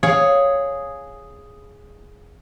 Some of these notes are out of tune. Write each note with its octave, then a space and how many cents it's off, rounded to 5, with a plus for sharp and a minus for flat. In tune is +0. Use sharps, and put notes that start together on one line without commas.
G#4 +0 C#5 +0 F5 +0